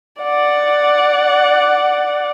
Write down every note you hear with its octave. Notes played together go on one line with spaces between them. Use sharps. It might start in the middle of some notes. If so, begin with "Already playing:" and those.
D5 F#5